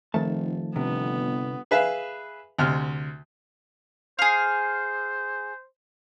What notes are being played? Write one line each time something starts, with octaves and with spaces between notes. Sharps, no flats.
F1 D#3 F3 A3 A5
G1 C3 B3
G#4 B4 E5 F5
D2 C3 F6
G#4 C5 F5